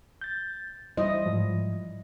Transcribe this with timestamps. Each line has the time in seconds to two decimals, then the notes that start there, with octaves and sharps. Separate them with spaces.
0.21 G6 A6
0.97 G3 E4 C5 D#5
1.26 G#2 F3